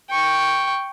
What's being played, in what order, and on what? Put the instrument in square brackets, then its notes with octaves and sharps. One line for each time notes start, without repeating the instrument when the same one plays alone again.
[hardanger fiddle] G5 C#6